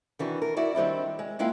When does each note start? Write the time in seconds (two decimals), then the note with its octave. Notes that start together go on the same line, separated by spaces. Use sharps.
0.19 D#3 E3 D4 F#4
0.42 A#4
0.57 E4 F#4 D5
0.75 D#3 G3 C4 D4 E4
1.19 G#3
1.39 G#3 A#3 E4 F4 F5 G5